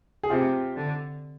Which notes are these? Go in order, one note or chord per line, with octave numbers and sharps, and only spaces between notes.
G#4
C3 F4 G4
D3